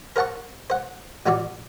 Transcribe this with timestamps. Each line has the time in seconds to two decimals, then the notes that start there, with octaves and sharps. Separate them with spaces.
0.16 A#4 C5 F#5 A5 C#6
0.70 C5 F#5
1.26 A1 F#3 F4 F#4 D5